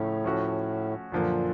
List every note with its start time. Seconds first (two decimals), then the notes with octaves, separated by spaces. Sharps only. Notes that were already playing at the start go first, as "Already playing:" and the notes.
Already playing: A2 C#3 F3 A3 C#4
0.24 F3 A3 C#4 F#4
1.11 F#2 A#2 D3 F3 A#3